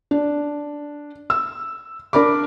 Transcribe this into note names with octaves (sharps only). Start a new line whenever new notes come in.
D4
E6
D4 A#4 D5 B5 D6